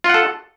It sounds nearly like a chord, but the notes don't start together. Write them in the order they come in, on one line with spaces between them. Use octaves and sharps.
F4 F#5 A4